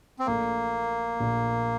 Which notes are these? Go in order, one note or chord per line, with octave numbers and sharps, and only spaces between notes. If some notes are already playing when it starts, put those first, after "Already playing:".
C4
A#1 A#2 A3 A#3
A#1 A#2 A3